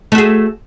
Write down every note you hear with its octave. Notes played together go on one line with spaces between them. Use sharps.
A3 F#4 G#4